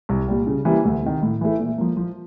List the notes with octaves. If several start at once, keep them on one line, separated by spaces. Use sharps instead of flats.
C2
A#2 G3
C#3
E3 G3 A#3
D2
C3 D#3
A2
E3 A3
A#2
F3 A#3
F3